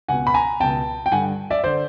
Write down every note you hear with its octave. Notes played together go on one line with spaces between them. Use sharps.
C#2 B2 F#5 G#5
B5
G#5 A#5
C#2 B2 G5 A5
G5
G2 D3 F#5 G#5
D5 E5
D3 C5 D5